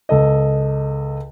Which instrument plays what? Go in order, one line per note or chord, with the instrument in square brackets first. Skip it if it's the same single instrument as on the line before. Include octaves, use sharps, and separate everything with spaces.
[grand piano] C#2 A4 D#5